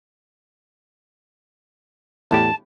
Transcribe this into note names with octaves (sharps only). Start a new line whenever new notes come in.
E2 A2 G4 A5